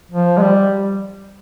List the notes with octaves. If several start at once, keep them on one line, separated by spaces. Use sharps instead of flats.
F3
G#3
G3